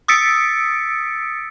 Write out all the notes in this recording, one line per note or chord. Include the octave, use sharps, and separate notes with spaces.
D#6 E6 A6 B6 C#7 D7